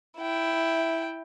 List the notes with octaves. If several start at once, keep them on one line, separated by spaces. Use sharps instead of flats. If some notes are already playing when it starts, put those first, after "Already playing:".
E4 G5